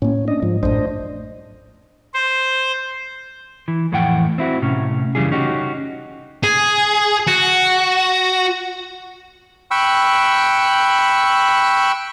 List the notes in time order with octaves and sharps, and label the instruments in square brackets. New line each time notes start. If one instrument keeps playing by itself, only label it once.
[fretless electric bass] A2 A#3 [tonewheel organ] C#4
[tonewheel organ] D4 D#5
[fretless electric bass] G#2 [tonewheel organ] F3
[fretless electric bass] A1 F#2 A2 [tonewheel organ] D4 C5 D#5
[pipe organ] C5
[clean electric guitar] E3
F2 A2 E3 F#5 G5
C4 E4 F#4
A2 C3 C#4
C2 F#2 C#3 E3 G3 G#4
C#4 D#4 F#4 G4
[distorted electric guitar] G#4
F#4
[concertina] G5 B5 C#6 E6 F#6